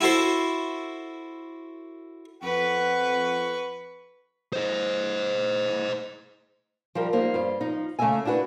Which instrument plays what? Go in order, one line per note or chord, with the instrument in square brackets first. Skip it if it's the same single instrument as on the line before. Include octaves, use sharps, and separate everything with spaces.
[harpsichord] E4 F#4 A4 C5
[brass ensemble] F2 F#5 [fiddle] B4 C#6
[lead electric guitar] C5 D#5
[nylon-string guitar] F3 G3 G4 A#4
F3 G3 A#3 D#4 C5
G2 C5
F3 D#4
C#3 A3 A#3 D#5 E5 G#5
D4 E4 F#4 G4 B4